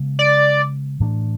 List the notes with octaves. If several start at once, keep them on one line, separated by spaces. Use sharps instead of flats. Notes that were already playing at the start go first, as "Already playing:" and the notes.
Already playing: C#3 G#3 B3
D5
A2 E3 A3 D4